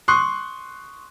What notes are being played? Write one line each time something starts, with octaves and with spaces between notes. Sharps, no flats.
C6 C#6 D#6 F#6 C7